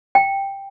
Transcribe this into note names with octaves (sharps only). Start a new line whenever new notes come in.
G5